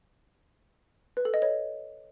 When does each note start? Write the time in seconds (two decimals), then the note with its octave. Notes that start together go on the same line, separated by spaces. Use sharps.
1.17 B4
1.25 A4
1.34 D#5
1.42 C#5